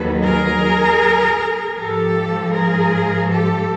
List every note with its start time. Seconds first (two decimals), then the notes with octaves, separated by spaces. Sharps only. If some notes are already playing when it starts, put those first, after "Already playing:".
Already playing: D#2 D#3 F#3 A4 B4
0.24 G#4 A#4
1.77 G#2 F3 G4 A4
2.54 G#4 A#4
3.30 G4 A4